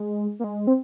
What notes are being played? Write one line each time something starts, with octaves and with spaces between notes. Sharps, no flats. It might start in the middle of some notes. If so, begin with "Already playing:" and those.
Already playing: G#3
A#3
G#3
C4